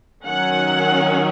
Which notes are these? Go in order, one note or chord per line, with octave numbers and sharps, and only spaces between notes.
D#3 F#3 C#4 F#5